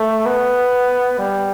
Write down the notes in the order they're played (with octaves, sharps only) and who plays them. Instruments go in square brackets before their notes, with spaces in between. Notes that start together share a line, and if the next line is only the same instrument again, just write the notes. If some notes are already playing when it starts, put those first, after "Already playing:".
Already playing: [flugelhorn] A3
B3
G3